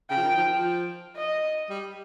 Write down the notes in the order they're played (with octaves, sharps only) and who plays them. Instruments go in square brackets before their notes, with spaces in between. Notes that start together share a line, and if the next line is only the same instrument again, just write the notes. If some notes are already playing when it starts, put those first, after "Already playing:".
[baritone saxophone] C#3 [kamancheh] G5
[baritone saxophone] F3
D#3
F3
F3
[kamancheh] D#5
[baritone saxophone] G3